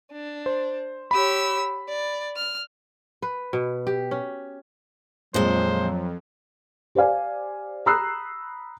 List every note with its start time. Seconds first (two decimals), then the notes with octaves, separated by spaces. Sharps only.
0.12 D4
0.46 C5
1.11 G4 C#5 B5 E6
1.88 D5
2.36 F6
3.22 B4
3.53 B2
3.87 G4
4.11 C#4
5.34 F2 A#2 F#3 G#3 C5
6.95 G4 C5 D5 F5 G#5
7.86 A#5 B5 D#6 E6 F#6 C7